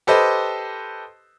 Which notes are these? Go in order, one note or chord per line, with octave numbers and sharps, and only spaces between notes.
G4 A4 B4 C5 D#5